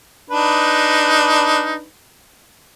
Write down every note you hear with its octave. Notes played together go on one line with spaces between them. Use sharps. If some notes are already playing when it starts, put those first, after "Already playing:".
D4 D#4 B4